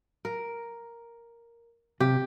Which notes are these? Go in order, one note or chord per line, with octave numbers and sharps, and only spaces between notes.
A#4
C3 G4